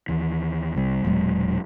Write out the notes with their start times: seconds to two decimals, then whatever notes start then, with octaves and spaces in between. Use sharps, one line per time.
0.08 D#2 E3
0.75 C2 C3 G3
1.05 E1 A#2 F#3 G#3